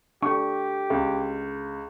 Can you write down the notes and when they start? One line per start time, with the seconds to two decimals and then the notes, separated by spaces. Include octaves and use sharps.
0.22 D4 G4 A4 C#6
0.90 C#2